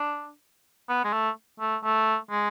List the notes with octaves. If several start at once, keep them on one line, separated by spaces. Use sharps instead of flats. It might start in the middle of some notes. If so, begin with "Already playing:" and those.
Already playing: D4
B3
G#3
A3
A3
A3
G#3